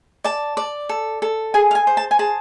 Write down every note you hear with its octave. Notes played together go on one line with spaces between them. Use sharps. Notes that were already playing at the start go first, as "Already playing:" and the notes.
D5 A5
D5
A4
A4
G#4 G#5
F5
G#5
C5
A5
G#5
G#4 A5